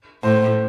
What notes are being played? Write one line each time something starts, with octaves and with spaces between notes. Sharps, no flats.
A2 C5